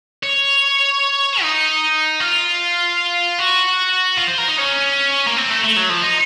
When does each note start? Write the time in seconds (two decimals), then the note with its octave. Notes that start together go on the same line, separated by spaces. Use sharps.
0.23 C#5
1.41 D#4
2.20 F4
3.39 F#4
4.18 F4
4.28 C5
4.38 A#4
4.48 D#4
4.58 C#4
5.27 A#3
5.37 C4
5.50 A3
5.64 A3
5.76 F#3
5.89 F3
6.03 D#4